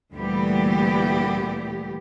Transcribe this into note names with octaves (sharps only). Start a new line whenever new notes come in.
D2 A#2 E3 G3 B3 G4